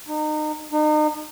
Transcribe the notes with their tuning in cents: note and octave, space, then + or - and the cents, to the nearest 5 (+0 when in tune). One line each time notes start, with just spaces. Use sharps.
D#4 -30
D#4 -35